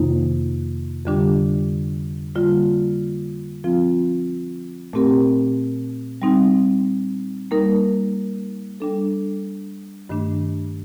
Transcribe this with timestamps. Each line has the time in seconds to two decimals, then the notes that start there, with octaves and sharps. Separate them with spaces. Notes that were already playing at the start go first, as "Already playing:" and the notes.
Already playing: F2 C3 D#3 A#3 D#4
1.05 F2 D3 G3 D4 G4
2.35 D3 G3 A#3 F4
3.64 F3 C4 F4
4.93 A#2 A3 C4 G4 A#4
6.22 G3 C4 D#4
7.51 G3 A#3 D#4 A#4
8.80 G3 D4 A4
10.09 G2 D#3 A3 D4